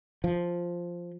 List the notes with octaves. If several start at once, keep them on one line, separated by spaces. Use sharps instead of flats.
F3